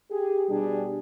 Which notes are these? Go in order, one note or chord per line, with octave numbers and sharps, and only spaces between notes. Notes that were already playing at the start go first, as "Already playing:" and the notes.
G4 G#4
B2 G3 D4 G4 G#4